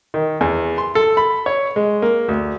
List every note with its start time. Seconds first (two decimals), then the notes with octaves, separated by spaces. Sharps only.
0.14 D#3
0.41 E2
0.78 C6
0.95 A4
1.17 B5
1.46 C#5
1.76 G#3
2.02 A#3
2.29 D2